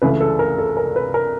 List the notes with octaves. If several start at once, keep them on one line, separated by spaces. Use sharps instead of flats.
C#2 C#3 E3 A3 B4
A4
A#4
A4
A#4
B4
A#4